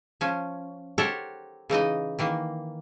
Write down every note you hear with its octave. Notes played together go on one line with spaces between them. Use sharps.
F3 C#4
G4 A4 A#4 C5 C#5 F#5
C#3 E3 D#4 D#5
D#3 E3 A#3